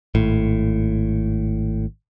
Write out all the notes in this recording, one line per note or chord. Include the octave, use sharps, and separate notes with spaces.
G#1 A2